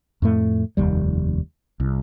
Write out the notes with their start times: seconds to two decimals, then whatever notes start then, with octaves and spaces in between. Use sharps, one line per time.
0.22 F2 A2 A3
0.77 F1 D#2 G3
1.80 C2